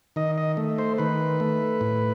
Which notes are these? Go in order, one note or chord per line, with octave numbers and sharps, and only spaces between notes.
D#3 D#5
D#5
A3
C5
D#3 B4
A3
A2